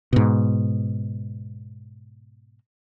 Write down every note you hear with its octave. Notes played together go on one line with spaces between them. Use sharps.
G#2 B2